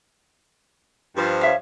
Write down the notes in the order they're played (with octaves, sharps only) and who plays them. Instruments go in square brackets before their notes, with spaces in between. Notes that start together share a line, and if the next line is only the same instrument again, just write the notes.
[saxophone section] G2 F3
[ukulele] C#5 E5 F5